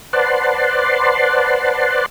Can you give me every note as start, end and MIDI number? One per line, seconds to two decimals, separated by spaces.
0.13 2.06 71
0.13 2.06 72
0.13 2.06 74
0.13 2.06 78
0.13 2.06 81
0.13 2.06 84